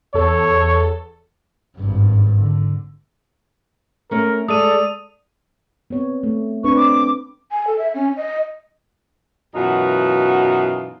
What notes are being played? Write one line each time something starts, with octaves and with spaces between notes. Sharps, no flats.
E2 A4 C#5
G#1 G2
D3
A3 C#4 A#4
G#3 A4 D5 D#6 D#7
B3 C4 C#5
A3
C4 D4 B4 C#6
D6
G#5
A4
E5
C#4
D#5
F#2 B2 E3 D#4 F4 F#4